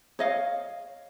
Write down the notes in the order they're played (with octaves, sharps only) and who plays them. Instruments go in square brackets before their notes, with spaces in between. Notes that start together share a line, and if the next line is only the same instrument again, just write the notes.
[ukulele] C#5 D#5 F5